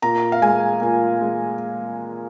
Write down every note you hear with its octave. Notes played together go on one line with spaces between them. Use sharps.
A#2 A#5
F5
G#3 G#5
A#2
G#3